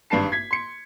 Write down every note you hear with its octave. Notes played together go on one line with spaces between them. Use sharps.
G#1 G2 D4 B4 A5 C7
G#6 B6
C6 C#7